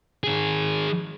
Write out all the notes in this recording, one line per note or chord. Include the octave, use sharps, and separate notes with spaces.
D#3 G#4